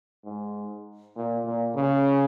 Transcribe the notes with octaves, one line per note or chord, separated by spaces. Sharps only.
G#2
A#2
A#2
C#3